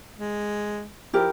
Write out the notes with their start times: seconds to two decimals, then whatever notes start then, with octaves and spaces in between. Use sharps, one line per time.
0.17 G#3
1.13 F3 E4 G4 A#4